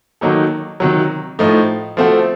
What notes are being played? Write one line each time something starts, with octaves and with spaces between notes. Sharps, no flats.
D#3 F#3 A#3 D#4 A4
C3 D#3 F#3
A2 F3 A3 D#4
F3 A3 C4 F#4 A4